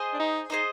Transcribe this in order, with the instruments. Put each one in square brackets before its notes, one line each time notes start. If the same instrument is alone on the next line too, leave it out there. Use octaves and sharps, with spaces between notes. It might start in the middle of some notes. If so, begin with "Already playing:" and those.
Already playing: [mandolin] G#4 C5 D#5
[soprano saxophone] D4
D#4
[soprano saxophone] D#4 [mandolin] G#4 C5 D#5